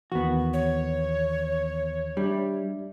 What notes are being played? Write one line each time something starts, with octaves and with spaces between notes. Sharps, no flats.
D#2 D#3 E3 B3 F#4
C#5
G3 D4 D5 E5